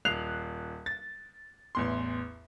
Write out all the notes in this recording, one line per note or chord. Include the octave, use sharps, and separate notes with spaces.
D#1 F#6 C7 F7
A6
A1 E2 C6